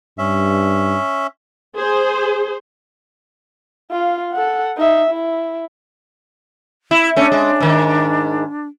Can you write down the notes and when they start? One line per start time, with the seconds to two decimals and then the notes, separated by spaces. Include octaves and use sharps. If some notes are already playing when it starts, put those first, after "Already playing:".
0.18 G2 C#4 E5
1.76 G#4 C5
3.91 F4 F5
4.33 A4 F#5
4.77 D#4 E5
5.11 E4
6.91 E4
7.16 A3 C#4 D4
7.32 G#3
7.61 G#2 D#3